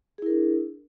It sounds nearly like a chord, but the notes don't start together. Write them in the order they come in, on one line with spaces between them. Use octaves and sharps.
G#4 E4 A#4 D4